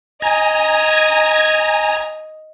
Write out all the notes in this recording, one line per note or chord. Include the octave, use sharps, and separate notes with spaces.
D#5 G#5 A#5